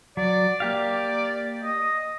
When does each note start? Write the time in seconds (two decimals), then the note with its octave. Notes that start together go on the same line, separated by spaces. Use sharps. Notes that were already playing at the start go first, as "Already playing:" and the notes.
0.17 F#3 D5
0.60 A#3 G4 D5 F5
1.62 D#5